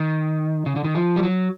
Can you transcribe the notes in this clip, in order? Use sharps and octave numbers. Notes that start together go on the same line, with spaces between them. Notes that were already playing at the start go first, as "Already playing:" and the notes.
Already playing: D#3
C#3
D3
D#3
F3
G3
F#3